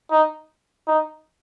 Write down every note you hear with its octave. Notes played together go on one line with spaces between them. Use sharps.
D#4
D#4